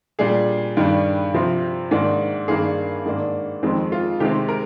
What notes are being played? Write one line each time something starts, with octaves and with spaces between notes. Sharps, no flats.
A#2 G3 D4 G#4
G2 D#3 G3 D4
C3 F3 C4
G#2 D#3 A#3 D4
G2 D#3 A#3 D4 G#4
G#2 D#3 A#3 D4
F2 D#3 G#3 C4
F4
C3 D#3 G#3 C4 G4
A#4